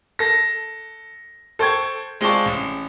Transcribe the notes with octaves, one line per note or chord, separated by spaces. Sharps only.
A4 A#6
A4 C5 G5 C#6 G#6
G#3 C4 F4 D5 A5 C#6
A1